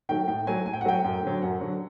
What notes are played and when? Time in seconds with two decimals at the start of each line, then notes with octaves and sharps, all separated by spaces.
0.09 D#3 F#3 A3 G5
0.28 A2 G5
0.47 F#3 A3 G#5
0.66 A2 G#5
0.73 G5
0.81 F#5
0.85 F#3 A3 G5
1.04 F#2
1.23 D3 F#3
1.42 F#2 F#5
1.61 D3 F#3